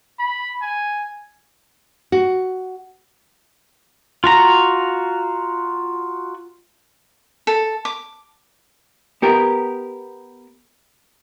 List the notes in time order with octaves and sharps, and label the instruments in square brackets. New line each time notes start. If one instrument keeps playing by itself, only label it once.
[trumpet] B5
G#5
[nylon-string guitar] F#4
[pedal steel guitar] F4 F#4 A#5
[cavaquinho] A4
D6
[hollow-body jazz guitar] B3 G4 A#4